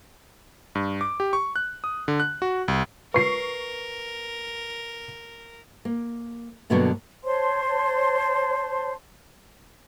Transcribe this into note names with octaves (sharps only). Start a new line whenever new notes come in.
G2
D6
G4
C#6
F#6
D#6
D3
F#6
F#4
C2
A#4 B4 C#6 C7
A#3
G2 B2 D3 F#3 A#3 B3
C5 C#5 A5 C6